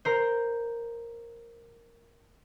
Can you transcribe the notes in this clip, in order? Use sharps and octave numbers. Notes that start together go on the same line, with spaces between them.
A#4 C5